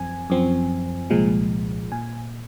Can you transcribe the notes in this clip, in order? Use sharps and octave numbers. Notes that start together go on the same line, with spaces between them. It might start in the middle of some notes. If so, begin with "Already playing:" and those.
Already playing: F#2 F3 C4 G#5
F#2 F3 C4
C2 A#2 F3 G#3
A#2 G#5